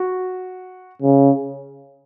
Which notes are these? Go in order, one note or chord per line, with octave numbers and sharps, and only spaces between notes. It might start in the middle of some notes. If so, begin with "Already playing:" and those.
Already playing: F#4
C#3